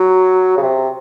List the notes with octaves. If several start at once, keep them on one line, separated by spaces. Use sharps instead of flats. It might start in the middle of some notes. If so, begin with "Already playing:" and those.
Already playing: F#3
C#3
C3